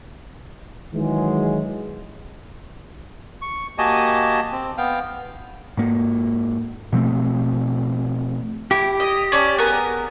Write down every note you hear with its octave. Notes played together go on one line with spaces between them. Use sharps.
D#3 E3 F#3 G#3
C#6
A#3 F#4 G4 D#5 G#5 A5
C4
B3 F5 G5
G#2 A#3
B2 F3 A3 C4
E4 G4
D#5
C#4 D5 A5
B3 G#4 A#4